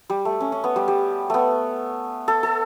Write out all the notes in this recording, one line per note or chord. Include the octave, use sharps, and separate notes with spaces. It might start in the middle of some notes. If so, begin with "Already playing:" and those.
G3
A3
C#4
C#4
B3
G3
G3
A3 B3
A4
A4